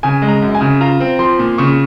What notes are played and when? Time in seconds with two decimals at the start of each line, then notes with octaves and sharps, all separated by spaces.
0.03 C#3 G#5
0.22 G#3
0.28 A#5
0.42 F#2
0.55 G#5
0.61 C#3
0.81 F4 A#5
1.00 C4
1.19 F3 C6
1.39 A#2
1.58 C#3 C#6